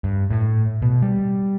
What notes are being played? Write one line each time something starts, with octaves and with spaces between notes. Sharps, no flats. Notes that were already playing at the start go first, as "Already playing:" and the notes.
G2
A2
B2
G3